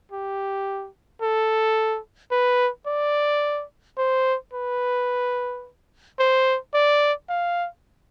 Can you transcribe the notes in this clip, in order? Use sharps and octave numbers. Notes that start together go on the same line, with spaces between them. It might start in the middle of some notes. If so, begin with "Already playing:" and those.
G4
A4
B4
D5
C5
B4
C5
D5
F5